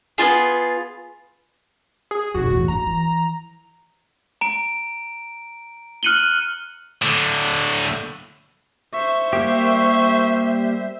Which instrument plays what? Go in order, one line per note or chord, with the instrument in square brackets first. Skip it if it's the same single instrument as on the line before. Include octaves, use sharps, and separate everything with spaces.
[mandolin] B3 D#4 F4 G#4
[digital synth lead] G#4
[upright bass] B1 F2 [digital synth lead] F#4
[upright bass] E2 A2
[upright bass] G2 [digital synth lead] A#5
[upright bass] E3
[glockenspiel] A#5 D7
F6 F#6 C#7 D#7 F#7 G7
[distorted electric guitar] A2 D3
[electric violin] C5 E5 [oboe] C#6
[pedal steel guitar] G3 A#3 G4